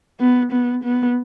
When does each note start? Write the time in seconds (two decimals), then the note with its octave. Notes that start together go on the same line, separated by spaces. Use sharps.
0.20 B3
0.52 B3
0.84 B3